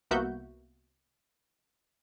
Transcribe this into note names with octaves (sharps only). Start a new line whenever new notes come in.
C2 A#3 B3 F#4 E5 G6